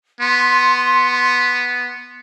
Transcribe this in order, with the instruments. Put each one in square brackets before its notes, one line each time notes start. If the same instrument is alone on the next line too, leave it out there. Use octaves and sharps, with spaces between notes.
[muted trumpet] B3 [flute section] C6